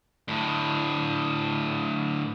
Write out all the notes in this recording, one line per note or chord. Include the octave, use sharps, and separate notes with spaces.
D2 A2